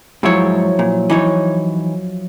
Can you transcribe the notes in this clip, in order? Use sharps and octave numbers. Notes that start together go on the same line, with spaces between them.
G#2 F3 F#3 E4 C#5
A#2
E3 D#4 C#5